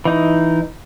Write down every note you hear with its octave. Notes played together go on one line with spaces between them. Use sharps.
E3 D#4